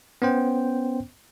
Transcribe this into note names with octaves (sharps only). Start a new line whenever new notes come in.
B3 C#4 C5 G5